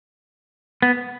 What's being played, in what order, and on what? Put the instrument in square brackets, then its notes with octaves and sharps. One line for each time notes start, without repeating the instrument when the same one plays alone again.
[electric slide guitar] B3